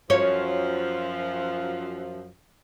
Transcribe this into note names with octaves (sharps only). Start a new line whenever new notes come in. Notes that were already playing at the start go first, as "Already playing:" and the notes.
F#2 F3 C#5